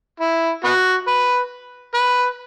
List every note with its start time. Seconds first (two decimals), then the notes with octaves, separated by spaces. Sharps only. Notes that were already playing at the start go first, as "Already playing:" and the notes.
0.20 E4
0.64 B3 F#4
1.08 B4
1.94 B4